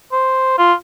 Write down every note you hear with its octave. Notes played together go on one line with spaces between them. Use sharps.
C5
F4